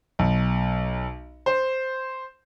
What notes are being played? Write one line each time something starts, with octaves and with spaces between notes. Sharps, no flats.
B1
C5